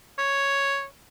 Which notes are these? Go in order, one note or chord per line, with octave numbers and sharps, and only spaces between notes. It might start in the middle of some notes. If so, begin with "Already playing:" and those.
C#5